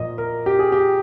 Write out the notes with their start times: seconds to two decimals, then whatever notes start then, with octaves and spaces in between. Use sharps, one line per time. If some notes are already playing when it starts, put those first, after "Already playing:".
Already playing: A#2 F3 D#5
0.18 A#4
0.46 G4
0.59 G#4
0.72 G4